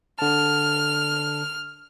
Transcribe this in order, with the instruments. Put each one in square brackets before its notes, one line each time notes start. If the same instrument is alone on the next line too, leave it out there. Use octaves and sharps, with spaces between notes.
[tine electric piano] D3 A5 [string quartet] F6